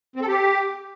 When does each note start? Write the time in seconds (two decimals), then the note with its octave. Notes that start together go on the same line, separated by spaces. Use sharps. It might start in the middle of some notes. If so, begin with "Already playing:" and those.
0.16 C4
0.22 A4
0.28 G4